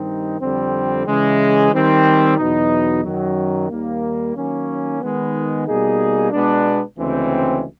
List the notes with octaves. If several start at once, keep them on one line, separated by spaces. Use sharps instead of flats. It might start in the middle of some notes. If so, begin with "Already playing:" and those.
Already playing: G2 D#3 G3 C4 D#4
F2 D3 G3 C4
C#3 E3 G#3
D#3 G3 C4
E2 B2 F#3 B3 D#4
F#2 D#3 F#3
D#2 D#3 G3 A#3
D#3 F#3 A#3 C#4
D#3 G#3 B3
B2 G3 A#3 D#4 G#4
B2 G#3 B3 D4
D2 C#3 E3 G#3 C4